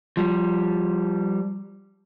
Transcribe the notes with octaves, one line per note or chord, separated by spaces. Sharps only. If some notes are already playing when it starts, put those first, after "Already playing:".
F3 G3